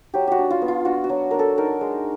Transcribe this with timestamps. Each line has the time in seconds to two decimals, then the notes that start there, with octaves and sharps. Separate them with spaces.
0.14 F#3 G4
0.27 F#4 G4
0.38 D4
0.50 F4
0.62 B3
0.68 F4
0.85 D4 F#4
1.04 F#4
1.09 F#3
1.31 D4 A#4
1.39 A4
1.58 D#4 A#4
1.81 G#3